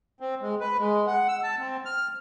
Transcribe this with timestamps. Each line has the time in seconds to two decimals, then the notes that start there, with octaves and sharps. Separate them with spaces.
0.20 C4
0.42 G#3
0.60 B4
0.79 G#3
1.07 F#5
1.28 E6
1.43 A5
1.59 C4
1.85 F6